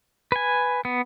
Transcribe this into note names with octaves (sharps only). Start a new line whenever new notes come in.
B4 G#5
B3